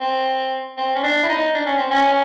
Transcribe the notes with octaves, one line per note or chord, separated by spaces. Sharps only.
C4
C4
C#4
D4
E4
D#4
D4
C#4
C4
C#4